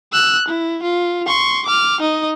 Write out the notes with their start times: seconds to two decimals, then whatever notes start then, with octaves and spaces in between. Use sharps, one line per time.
0.13 E6 F#6
0.48 E4
0.83 F4
1.27 C6 C#6
1.66 D6 F6
2.01 D#4 D#5